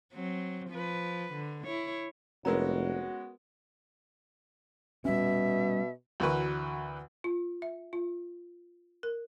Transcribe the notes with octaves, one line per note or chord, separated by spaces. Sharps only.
F#3 C4
F3 B4
D3
E4 C#5
F1 G#3 B3 C#4 F#4 A#4 A#5
B2 G3 C#4 E5
D2 E3 F#4 A#4 B4 C#6
F4
E5
F4
A#4